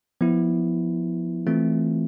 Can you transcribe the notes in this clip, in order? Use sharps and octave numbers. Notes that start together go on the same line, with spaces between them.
F3 B3 E4
E3 A3 C4 F4